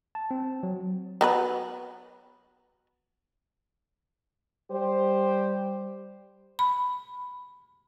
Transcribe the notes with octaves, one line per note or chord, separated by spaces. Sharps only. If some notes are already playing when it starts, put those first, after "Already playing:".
A5
C4
F#3
F#3 B3 B4
G3 G4 C5
B5